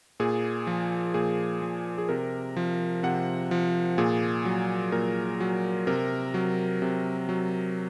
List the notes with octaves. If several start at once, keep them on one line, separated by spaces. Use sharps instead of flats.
A#2 G#4
F3
A#2 G#4
F3
G#4
C3 A#4
F3
C3 F#5
F3
A#2 G#4
F#3
A#2 A#4
F#3
C3 A#4
F#3
C3
F#3